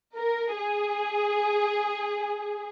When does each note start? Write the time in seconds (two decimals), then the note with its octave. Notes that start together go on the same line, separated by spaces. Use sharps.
0.17 A#4
0.57 G#4